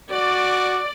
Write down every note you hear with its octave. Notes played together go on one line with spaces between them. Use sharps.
F#4 D5